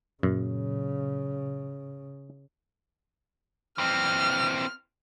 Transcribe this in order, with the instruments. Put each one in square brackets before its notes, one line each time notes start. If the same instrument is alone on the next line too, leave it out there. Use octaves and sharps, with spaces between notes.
[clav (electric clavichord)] F#2 [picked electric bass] A#2 F#3 [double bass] C#3
[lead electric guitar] E3 C4 [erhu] F6